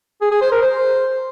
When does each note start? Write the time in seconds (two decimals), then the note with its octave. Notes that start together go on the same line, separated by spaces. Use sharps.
0.21 G#4
0.31 G#4
0.42 C5
0.52 A#4
0.62 C5